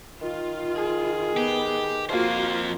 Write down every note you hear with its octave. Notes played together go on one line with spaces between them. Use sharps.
D#3 F4
G#4
B3 G4
F2 A#3 F4 F#4 C5